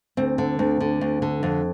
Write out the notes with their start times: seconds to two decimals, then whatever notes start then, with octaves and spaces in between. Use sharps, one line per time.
0.17 D2 C4
0.38 D3
0.59 D2
0.80 D3
1.01 D2
1.22 D3
1.43 F2